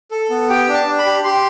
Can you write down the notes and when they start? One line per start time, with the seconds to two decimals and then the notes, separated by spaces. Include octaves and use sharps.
0.11 A4
0.30 B3
0.49 G4 G5
0.68 D4
0.74 A5
0.87 D4
0.99 B5
1.06 G4
1.24 G4 C6